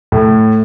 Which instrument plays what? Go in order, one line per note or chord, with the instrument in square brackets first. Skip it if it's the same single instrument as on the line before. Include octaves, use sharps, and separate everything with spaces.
[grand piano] A2